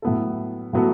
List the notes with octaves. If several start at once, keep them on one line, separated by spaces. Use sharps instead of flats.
A2 F#3 B3 F#4 A4
A2 F#3 B3 F#4 A4